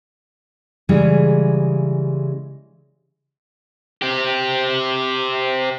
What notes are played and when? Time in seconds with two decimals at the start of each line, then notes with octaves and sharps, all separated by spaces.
0.89 C#3 E3 G3 G#3
4.02 C4 G4